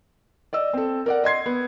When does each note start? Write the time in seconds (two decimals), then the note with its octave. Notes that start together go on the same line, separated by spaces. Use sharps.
0.53 D5 D#5 E6
0.73 C4 A4
1.06 A#4 D5 F#5
1.24 D#5 C6 G#6 C7
1.46 B3